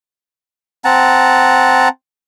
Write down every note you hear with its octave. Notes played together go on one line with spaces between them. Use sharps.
C4 F#5 A5 A#5